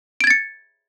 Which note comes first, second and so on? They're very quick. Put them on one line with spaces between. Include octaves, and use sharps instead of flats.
D7 G#6 A6 C#7